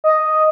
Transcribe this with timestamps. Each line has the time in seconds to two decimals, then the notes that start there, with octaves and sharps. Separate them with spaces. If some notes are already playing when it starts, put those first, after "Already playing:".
0.04 D#5